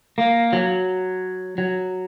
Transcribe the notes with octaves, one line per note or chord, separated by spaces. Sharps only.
A#3
F#3
F#3